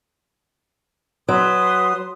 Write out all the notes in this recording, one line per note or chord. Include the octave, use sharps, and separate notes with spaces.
F#3 B4 C6 D#6